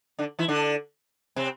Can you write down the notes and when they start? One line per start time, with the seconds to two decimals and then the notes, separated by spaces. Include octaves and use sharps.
0.19 D3 D4
0.39 E3 E4
0.48 D3 D4
1.36 C3 C4